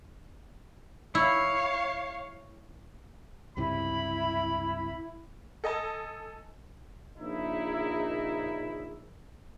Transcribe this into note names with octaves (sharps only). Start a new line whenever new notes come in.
E4 C#5 F5
C#2 G2 C3 E4 B5
A4 D#5 G#5 A5
A#1 C#3 D#4 E4